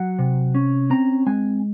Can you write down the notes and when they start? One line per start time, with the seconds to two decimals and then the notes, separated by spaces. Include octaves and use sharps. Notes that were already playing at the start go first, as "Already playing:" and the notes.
Already playing: F#3 F#5
0.19 C3
0.55 C#4
0.90 C4 A#5
1.26 G#3 G#5